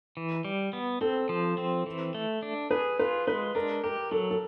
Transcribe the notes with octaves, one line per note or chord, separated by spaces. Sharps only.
E3
G3
B3
C4 A4
F3
C4
E3
A3
D4
G#4 B4
F4 B4
G#3 B4
D4 A#4
G4 A#4
F#3 A4
A4